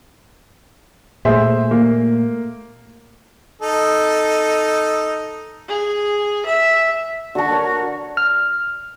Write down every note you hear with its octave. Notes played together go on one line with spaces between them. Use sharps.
A#2 A3 G#4 C5 E5
A#3
D#4 A4
G#4
E5
D3 F#4 A5
A#4 C#5
F6